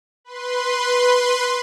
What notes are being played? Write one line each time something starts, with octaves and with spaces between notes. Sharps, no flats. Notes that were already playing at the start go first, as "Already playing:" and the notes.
B4 C6